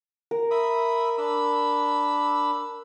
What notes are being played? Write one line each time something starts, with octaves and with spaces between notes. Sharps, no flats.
A#4
E5 B5 D#6
D4 B5 E6